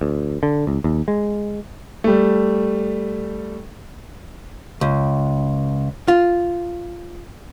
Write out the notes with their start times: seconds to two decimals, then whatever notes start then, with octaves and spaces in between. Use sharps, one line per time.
0.01 D2
0.43 D3
0.67 C#2
0.84 D#2
1.08 G#3
2.04 G3 A3
4.81 C#2
6.08 F4